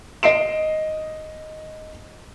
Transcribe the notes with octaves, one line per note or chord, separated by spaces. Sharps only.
D#5 C7 D7 E7